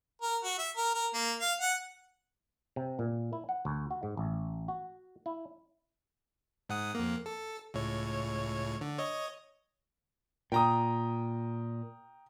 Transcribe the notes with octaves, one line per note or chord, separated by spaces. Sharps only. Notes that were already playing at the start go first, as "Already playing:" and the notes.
A#4
F#4
E5
A#4
A#4
A#3
F5
F#5
C3
A#2
E4
F#5
D2
F#4
G#2
A1
F#4
E4
G#2 F#5 D#6
F2 A#3
A4
C#2 A2 C#5
D3
C#5 D#5
A#2 G5 A#5 D#6